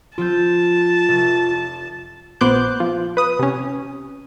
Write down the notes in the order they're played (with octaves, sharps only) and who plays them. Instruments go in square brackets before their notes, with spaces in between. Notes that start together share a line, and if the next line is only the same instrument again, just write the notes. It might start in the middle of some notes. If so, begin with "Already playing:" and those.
[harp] F3 C4 G6 [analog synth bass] F4 [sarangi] A5
[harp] F1
[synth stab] A#1 B3 C5 D6 F#6 G6
F3
B4 D#6
C3 C#4